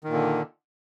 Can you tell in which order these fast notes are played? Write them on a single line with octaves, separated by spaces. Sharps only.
D#3 A#2 D3